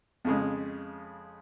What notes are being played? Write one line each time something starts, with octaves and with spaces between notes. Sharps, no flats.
F2 C#3 G#3